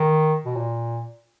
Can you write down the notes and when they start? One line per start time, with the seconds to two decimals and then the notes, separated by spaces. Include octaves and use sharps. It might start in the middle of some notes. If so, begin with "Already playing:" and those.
Already playing: D#3
0.45 B2
0.56 A#2